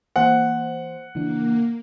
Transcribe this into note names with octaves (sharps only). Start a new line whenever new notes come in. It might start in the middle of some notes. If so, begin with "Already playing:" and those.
E3 A#3 C5 F#5
C#3 E3 A#3 D4